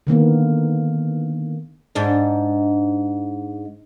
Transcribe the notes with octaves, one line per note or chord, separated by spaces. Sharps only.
D3 D#3 A#3 B3
G#2 D4